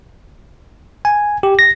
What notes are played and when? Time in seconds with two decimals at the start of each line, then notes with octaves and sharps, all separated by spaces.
1.05 G#5
1.43 G4
1.59 A#6